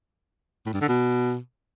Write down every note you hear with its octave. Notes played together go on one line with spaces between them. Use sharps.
A2
G2
D3
B2